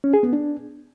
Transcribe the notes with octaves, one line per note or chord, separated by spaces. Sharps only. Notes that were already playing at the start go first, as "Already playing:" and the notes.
C#4
G#4
B3
D4